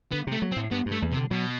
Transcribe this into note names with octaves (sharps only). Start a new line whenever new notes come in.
D3 B3
C3
A3
F#3
C4
A2
G2 B3
G2
A3
E2
C3
D3
B2 F#3